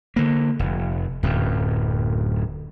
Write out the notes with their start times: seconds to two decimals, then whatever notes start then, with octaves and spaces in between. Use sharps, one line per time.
0.16 D3 A#3
0.59 F1
1.23 D1 F#2